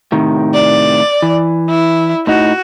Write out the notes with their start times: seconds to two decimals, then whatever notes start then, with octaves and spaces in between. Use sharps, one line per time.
0.12 A2 C3 D#3
0.54 D5
1.22 E3
1.69 E4
2.27 A2 D#4 F#4